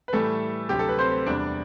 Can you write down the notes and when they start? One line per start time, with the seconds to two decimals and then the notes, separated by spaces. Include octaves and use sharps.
0.08 B4
0.13 A2 E3 G3 A3 A4
0.69 D2 C3 F#3 G4
0.79 A4
0.89 B4
0.98 C4 C5
1.26 E2 C3 G3 D4 D5